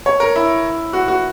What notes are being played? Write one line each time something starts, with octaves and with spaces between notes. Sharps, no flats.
C#5
A#4
E4
F#4
F#4